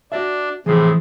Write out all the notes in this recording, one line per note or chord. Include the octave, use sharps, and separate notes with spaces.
D4 F#4 D5 E5
A2 C3 E3 F3 G#4